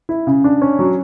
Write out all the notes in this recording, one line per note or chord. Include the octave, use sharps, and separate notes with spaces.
E4
C#3
D4
C#4
F#3